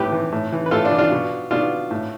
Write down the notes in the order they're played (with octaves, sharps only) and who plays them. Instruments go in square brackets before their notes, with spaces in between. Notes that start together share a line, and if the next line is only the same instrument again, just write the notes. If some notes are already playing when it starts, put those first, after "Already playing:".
Already playing: [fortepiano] A2 E3 G4 B4
E3
A2
E3
B4
A2 F4 A4
D4 F4
E3
D4 F4
B2
B2 D4 F4
A2